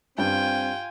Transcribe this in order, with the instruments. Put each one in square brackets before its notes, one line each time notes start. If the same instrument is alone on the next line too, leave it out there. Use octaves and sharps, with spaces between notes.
[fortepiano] G2 [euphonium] C4 [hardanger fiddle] F4 G#5 [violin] G5